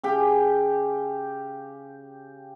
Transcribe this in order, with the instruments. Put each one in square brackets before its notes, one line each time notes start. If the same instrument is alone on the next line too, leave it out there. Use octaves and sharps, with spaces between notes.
[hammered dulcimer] C#3 G4 G5